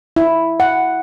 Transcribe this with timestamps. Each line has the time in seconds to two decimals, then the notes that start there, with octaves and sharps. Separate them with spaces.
0.16 E4
0.60 F#5